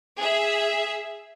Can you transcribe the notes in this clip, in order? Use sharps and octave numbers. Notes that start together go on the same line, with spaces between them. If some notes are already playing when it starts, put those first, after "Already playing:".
G#4 E5